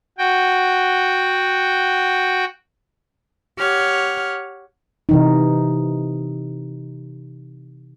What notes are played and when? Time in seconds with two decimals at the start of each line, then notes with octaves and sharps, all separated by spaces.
0.18 F#4 G5
3.58 G4 C#5 F#5 F6
5.09 C3 E3 D#4